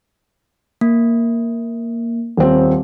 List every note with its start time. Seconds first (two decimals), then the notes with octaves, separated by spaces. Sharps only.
0.81 A#3
2.37 D#1 C4